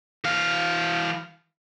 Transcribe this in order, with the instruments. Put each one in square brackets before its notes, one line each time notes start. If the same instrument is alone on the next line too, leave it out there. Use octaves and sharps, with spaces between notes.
[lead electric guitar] E3 F5